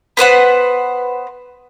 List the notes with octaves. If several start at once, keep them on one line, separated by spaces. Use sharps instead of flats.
B3 B4 C5 F#5